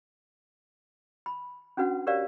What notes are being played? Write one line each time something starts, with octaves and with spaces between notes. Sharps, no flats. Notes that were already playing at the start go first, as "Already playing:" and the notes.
B5
C#4 D4 F#4 B4 F#5
G4 A#4 C#5 D5 F5